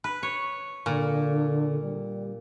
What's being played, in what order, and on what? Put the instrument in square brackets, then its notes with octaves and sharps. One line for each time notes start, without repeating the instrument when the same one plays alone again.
[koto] B4
C#5
[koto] A#2 [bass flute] D3
[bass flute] G3